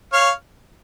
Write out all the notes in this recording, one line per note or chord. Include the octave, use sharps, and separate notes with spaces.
C#5 F5